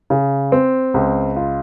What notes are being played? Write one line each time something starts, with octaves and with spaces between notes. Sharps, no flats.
C#3
C4
C#2
F4